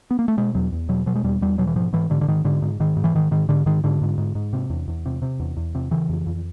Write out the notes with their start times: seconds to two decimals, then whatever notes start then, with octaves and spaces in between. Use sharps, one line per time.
0.11 B3
0.19 A#3
0.28 A3
0.37 B2 G#3
0.55 E2 F#3
0.72 E2
0.89 B2 F#3
1.06 B2 F#3
1.15 G#3
1.24 E2 G3
1.41 E2 G3
1.58 B2 F#3
1.67 E3
1.76 G#2 F3
1.93 G#2 E3
2.10 G#2 D3
2.21 D3
2.28 G#2 D#3
2.45 G#2 D3
2.62 G#2
2.80 G#2 D#3
2.97 G#2
3.04 E3
3.14 G#2 D#3
3.31 G#2 D#3
3.49 G#2 D3
3.66 G#2 D#3
3.84 G#2 D3
4.01 G#2
4.18 G#2
4.35 G#2
4.53 C3
4.70 E2
4.88 E2
5.06 C3
5.22 C3
5.40 E2
5.57 E2
5.75 C3
5.91 C#3 E3
6.09 F2
6.26 F2